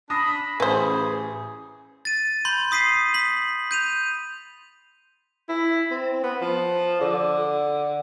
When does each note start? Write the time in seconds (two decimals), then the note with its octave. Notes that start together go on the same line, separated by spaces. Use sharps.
0.10 D4 A5 B5 D#6 A#6
0.60 A1 G#4 B4 C5
2.05 A6 D#7
2.45 B5 C6 G6
2.71 C6 D#6 B6 C7 D#7
3.14 B6 F#7
3.71 G6 D#7 F7
5.49 E4
5.91 C4
6.23 B3
6.42 F3
7.01 D3